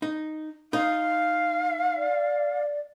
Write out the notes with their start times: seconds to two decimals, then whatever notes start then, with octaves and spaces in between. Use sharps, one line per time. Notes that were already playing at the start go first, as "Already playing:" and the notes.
0.02 D#4
0.73 D#4 F5
1.97 D5